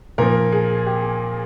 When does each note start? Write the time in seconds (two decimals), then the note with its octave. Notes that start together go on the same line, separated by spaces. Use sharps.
0.18 A#2 F3 A#4
0.52 G#4
0.87 G4